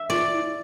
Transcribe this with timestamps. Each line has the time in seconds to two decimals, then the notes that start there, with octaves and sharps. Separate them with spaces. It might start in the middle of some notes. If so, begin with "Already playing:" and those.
Already playing: E5
0.10 F4 D5
0.33 E4